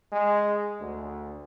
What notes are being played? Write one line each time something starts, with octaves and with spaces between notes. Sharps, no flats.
G#3
D2